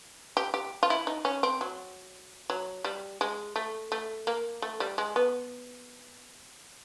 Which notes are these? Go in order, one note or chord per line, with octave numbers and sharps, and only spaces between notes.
G4
G4
F4
E4
D#4
C#4
C4
F#3
F#3
G3
G#3
A3
A3
A#3
A3
G3
G#3
B3